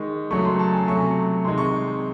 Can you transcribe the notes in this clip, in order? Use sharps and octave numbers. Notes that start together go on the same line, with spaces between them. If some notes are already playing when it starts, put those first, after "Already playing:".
Already playing: D#3 G#3 C#6
C#3 F#3 A3 C#6
C6
A5
G#5
C3 F#3 A3 C#6
C3 D#3 G#3 C6
C#6